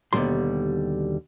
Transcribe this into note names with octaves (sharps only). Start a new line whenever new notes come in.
D#2 B2 D3 E3 G3 C6